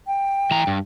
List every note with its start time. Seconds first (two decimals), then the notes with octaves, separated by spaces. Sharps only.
0.07 G5
0.51 E3 A#5
0.67 G2